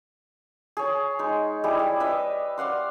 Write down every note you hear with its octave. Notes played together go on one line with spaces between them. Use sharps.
G#4 C#5
G#3 D#4
G3 E4 G#4
G3
B4 D#5 E5
D5 F5 F#5 C6